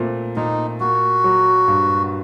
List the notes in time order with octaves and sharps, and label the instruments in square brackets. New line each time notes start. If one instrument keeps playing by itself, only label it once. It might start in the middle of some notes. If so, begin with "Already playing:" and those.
Already playing: [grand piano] A#2 A3 C4
[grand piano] A#2 [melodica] D#4
[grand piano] A#3 [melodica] F#4
[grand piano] F#3
G2